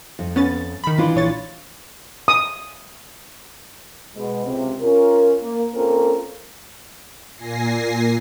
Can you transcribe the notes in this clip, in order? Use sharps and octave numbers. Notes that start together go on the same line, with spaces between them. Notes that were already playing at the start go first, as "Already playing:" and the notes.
F2
B3 C#4 A6
D#3 B5
E3 D4 F4
A#1 C#5 A6
D#6
B2 G#3 B3
C#2 C3
C#4 F4 A#4
A#3
A#3 C4 C#4 F4 A4 A#4
A#2 G#5 A#6 C7